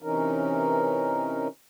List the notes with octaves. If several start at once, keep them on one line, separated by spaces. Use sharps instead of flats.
C3 E3 C#4 D#4 A#4